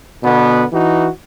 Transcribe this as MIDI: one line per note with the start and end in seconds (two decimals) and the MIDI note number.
0.24 0.63 47
0.24 0.63 50
0.24 0.63 59
0.71 1.07 52
0.71 1.07 63
0.71 1.07 66